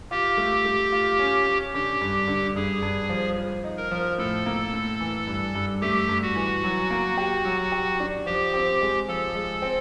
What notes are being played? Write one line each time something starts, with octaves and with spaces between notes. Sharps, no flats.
F4 G4
A3
A3
F4
C#4
C#4
D3 G4
G2
D3
G2 G#4
G2
F3
F3
D#4
A#4
F3
A2 A4
A#3
A2
E3
G2
G2
A3 G4
G2
F#4
E3
F#3
A#3
G4
F#3
G4
D4
F3 G4
C4
G#3
F3 A4
G#3
C4